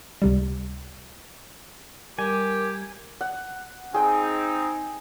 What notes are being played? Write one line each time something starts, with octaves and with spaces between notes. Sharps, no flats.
C#2 C3 G3
G3 G4 A#4 G#5
F#5
C4 D#4 G#4 G5